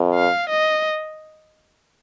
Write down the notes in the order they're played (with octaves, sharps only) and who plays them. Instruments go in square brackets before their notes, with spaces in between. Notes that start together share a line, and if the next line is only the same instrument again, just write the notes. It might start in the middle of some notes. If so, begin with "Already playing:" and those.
Already playing: [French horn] F2
[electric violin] F5
D#5